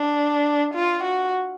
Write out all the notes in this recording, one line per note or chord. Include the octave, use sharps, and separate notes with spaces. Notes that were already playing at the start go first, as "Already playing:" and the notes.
Already playing: D4
F4
F#4